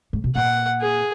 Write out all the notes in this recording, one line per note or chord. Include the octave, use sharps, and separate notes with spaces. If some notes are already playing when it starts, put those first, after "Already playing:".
G#2
B2
A#2 F#5
G#4